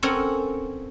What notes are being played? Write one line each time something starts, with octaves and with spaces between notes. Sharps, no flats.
C4 C#4 A4 A#4 F#5 G#5